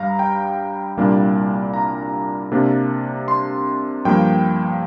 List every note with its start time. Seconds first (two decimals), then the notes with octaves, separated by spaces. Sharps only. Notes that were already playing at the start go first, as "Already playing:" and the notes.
Already playing: G2 G3 F5 A#5
0.19 G5
0.97 C2 A#2 G3 A#3 D4
1.74 A#5
2.52 C3 A#3 D4
3.28 C6
4.05 G2 F3 A#3 G5